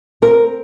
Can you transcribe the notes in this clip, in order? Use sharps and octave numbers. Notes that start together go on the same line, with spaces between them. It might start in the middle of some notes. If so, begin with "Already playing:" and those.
C4 A#4